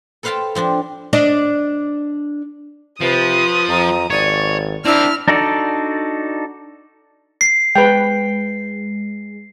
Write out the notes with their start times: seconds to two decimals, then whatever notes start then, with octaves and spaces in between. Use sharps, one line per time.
0.23 A4 B4 C5 F5 G5 A5
0.55 F3 C4 D4 C5
1.13 D4 D5 D#5
3.01 C3 F3 B4 D#6
3.68 F2 A#5
4.10 G#1 C#5 D5
4.85 C4 D4 E4 A#4 F6
5.28 D4 D#4 F#4 A4 D5
7.41 C7
7.75 G#3 B4 G5